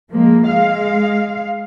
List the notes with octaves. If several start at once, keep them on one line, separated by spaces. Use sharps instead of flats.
F3 G#3 A#3
G#3 F5